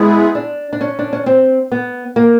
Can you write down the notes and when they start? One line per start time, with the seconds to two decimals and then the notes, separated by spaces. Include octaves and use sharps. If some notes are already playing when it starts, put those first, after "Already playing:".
Already playing: G#3 B3 E4 G#4
0.35 D4
0.73 D4
0.81 C#4
0.99 D4
1.13 C#4
1.26 C4
1.72 B3
2.16 A#3